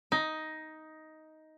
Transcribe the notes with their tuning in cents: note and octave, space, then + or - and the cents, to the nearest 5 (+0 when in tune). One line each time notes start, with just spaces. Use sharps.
D#4 +10